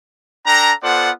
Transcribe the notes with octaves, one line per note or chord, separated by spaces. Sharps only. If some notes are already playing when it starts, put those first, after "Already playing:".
D4 A4 G5 A#5
B3 F4 A4 C5 D5 F#5